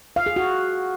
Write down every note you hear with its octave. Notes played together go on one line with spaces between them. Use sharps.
F5
G#4
F#4